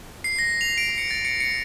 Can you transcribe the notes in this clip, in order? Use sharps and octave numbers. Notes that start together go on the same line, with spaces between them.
C7
A#6
F7
D7
C#7
A6
C#7
C#7